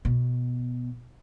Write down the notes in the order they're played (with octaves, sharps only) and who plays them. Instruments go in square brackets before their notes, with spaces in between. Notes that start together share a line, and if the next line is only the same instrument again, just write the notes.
[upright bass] B2